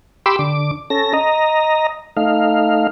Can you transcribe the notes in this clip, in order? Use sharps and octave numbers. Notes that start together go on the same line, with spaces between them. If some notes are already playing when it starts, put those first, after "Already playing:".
G4 B5 C6 D6 E6
D3 D6
C#4 A4 A#6
D#5 A#5
A3 D#4 F5